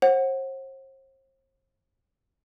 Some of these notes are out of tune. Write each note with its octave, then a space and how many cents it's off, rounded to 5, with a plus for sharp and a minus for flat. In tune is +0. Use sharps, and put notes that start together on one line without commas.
C5 +40 F#5 +0